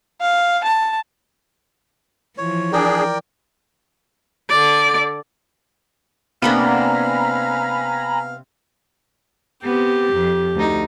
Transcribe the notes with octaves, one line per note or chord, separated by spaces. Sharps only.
F5
A5
E3 F3 C#5
D4 G#4 A#4 D5 G5
D3 D5
C3 A#3 B3 D4 F5 G#5 A#5 B5
B3 C4 G4
F2
D2 D#4